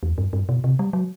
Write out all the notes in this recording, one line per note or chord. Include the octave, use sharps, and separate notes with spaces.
E2
G2
G2
B2
C3
G3
F#3